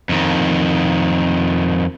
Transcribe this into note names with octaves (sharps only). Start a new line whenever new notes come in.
F2 D#3